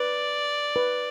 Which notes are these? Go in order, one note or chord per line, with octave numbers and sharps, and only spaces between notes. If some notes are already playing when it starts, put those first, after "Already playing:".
Already playing: B4 D5
B4